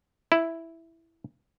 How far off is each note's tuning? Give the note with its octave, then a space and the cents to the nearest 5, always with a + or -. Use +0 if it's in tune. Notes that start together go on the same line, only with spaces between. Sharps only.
E4 +0